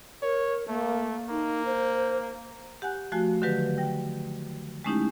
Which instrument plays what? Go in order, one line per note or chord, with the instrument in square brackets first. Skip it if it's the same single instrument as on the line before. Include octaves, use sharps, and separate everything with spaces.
[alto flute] A#4 [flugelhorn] C#5
[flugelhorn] A3 [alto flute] A#3
[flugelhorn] A#3 [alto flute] D#4
[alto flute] C5
[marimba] G4 F#5 G#5 F#6
F3 A3 F#4 G#5 F#6
D3 D#3 F#3 G4 B4
G5 A#6
G#3 A3 C#4 D#4 E4 G4